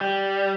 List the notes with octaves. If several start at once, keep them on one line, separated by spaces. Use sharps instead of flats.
G3